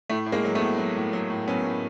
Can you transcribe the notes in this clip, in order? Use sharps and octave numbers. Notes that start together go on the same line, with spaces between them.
A2 A3
A2
G#3 A#3
F#3
A3 B3
A2
F#3
A2
F#3
A2
F#3 B3 C#4
A2